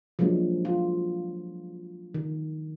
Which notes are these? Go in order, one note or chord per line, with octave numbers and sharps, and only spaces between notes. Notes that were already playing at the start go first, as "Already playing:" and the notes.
F3 F#3 G#3 A#3 D4
F4
D#3